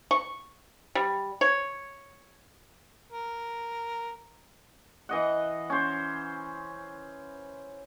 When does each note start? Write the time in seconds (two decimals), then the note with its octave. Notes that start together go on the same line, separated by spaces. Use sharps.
0.11 C#6
0.95 G3
1.41 C#5
3.10 A#4
5.09 E3 D#5 F#5
5.70 C#4 C5